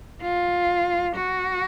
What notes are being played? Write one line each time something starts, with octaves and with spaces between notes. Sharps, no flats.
F4
F#4